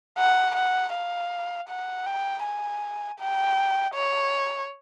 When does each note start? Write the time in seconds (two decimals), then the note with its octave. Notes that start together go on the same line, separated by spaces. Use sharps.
0.19 F#5
0.56 F#5
0.93 F5
1.69 F#5
2.06 G5
2.44 G#5
3.20 G5
3.95 C#5